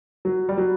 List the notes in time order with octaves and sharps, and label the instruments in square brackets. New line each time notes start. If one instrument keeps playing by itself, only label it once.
[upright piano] F#3
G3
F#3